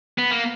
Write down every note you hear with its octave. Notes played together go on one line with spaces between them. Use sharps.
B3
A#3